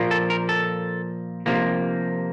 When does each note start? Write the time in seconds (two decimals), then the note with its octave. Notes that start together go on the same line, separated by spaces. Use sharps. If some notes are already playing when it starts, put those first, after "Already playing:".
Already playing: A#2 F3 A#3
0.11 A4
0.30 A#4
0.49 A4
1.46 C3 F3 A#3